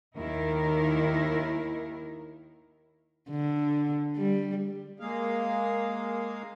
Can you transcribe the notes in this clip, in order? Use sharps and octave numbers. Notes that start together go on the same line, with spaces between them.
D#2 D#3 E4 A#4
D3
G3
G#3 A#3 G#4 F5